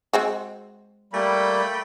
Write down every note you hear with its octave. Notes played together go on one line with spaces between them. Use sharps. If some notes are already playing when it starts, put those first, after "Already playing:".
G#3 C4 F#4
G3 A3 A#3 G5 B5